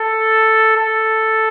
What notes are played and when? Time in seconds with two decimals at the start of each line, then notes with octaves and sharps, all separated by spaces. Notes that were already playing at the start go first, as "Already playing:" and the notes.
Already playing: A4
0.76 A4